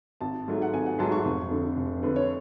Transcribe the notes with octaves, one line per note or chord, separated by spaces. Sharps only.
G#1 A5
G#2 F#3 A3
F#5
G#1 G#5
F#5
G#2 F#3 A3 A5
C#6
F1
F2 D3
F1
F2 D3 B4
C#5